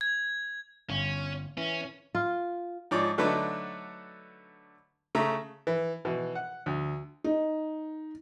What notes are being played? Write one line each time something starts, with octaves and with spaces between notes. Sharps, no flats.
G#6
G1 C#4
E3 C#4
F4
G#2 F3 C#5 D5
D3 F#3 A3 D4 D#4 B4
C#3 A3 E5 A#5
E3
B2 E3
F#5
D2
D#4